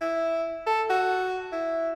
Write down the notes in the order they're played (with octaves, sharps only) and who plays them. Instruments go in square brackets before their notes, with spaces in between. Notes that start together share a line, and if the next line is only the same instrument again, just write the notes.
[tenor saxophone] E4
A4
F#4
E4